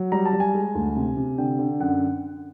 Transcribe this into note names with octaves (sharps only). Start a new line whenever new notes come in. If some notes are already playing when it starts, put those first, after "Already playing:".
Already playing: F#3
G3 A#5
A5
G3
G#5
G#3
D2
C3
C3
D3 G5
D3
F#2 F#5